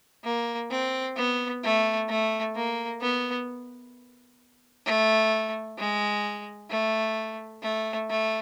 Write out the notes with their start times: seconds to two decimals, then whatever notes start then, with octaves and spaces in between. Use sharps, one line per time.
0.24 A#3
0.71 C4
1.16 B3
1.63 A3
2.09 A3
2.55 A#3
3.01 B3
4.86 A3
5.78 G#3
6.70 A3
7.63 A3
8.09 A3